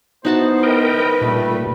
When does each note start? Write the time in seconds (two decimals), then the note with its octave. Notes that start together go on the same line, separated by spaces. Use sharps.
0.25 B3 D#4 E4 F#4 C5 A5
0.63 A#4 B4 D#5 G5
1.21 G2 A#2 G3 A3